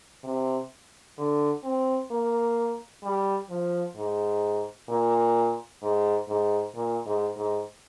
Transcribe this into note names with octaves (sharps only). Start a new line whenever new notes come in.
C3
D3
C4
A#3
G3
F3
G#2
A#2
G#2
G#2
A#2
G#2
G#2